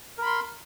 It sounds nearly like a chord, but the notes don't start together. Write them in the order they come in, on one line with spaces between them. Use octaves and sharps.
A#4 B5 C6